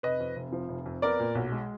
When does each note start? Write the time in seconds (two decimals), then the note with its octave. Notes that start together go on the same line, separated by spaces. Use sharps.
0.03 F1 B4 D#5
0.20 F2
0.36 F1
0.52 F3
0.69 F1
0.86 F2
1.02 B3 A#4 D5
1.20 A#2
1.35 B1
1.52 G#3